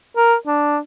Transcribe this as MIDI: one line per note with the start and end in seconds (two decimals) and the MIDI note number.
0.17 0.35 70
0.47 0.78 62